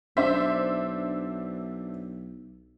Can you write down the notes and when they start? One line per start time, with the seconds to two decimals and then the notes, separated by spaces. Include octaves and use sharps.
0.17 B1 D4 C5 E5